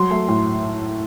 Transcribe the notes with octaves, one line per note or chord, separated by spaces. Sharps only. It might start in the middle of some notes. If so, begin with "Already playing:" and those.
Already playing: F#3 C6
A3
A2